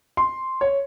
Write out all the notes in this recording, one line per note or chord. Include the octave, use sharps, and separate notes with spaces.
C6
C#5